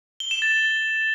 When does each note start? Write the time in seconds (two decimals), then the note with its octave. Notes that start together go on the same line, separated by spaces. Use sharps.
0.20 G7
0.31 E7
0.42 A6